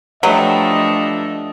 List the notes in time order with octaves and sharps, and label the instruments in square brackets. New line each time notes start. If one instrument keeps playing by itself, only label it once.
[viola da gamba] F3 A3 D4 [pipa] F#3 [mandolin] G4 B4 F#5 [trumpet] D#5